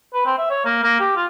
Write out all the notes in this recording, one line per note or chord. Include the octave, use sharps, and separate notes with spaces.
B4
C4
E5
C#5
A#3
A#3
G4
F4